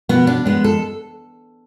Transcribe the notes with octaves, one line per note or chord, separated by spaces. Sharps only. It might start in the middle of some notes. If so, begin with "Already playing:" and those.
B2 B3
D4
G#3 B3
A4